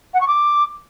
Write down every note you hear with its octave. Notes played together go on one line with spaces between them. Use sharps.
F#5
C#6
D6